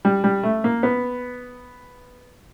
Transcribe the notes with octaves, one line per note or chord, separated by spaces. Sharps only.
G3
G3
A3
A#3
B3